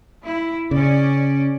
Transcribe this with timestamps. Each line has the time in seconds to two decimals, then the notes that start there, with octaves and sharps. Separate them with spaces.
0.25 E4
0.71 C#3 C#4 D5